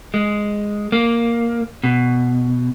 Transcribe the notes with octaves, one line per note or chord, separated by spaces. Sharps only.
G#3
A#3
B2